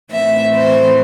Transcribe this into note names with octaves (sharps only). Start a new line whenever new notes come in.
A2 E3 A3 C4 E5
C5